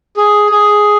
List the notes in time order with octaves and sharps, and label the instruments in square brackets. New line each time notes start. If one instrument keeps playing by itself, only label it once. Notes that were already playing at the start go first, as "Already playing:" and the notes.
[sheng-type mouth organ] G#4
G#4